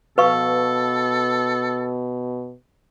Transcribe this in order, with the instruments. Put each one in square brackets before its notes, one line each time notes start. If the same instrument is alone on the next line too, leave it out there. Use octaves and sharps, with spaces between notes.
[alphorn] B2 [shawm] A4 [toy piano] B4 F5 C#6